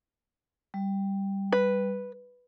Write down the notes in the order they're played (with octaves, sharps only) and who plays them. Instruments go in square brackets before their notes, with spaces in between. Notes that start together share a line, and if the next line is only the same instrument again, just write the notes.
[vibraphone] G3
[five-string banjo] B4